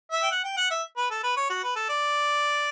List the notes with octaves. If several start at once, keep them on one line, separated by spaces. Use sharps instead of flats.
E5
G5
F#5
G5
F#5
E5
B4
A4
B4
C#5
F#4
B4
A4
D5